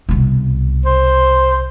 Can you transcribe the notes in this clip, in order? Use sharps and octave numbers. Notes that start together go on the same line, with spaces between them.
C2 B2
C5